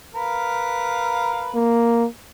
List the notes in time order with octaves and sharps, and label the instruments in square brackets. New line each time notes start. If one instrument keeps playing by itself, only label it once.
[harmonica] A#4 B4 F5
[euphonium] A#3